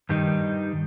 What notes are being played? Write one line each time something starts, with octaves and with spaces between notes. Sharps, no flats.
G2 D#3 G3 D#4